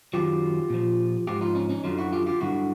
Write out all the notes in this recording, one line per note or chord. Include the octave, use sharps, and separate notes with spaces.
F#2 D#3 F#3 F4 G4
A#2 F3
G#2 F3 F4 G4
D#4 F4
C#4 D#4
C#4 D#4
F#2 D3 F#3 D#4 F4
E4 F#4
F4 G4
F4 G4
G2 D3 F#3 E4 F#4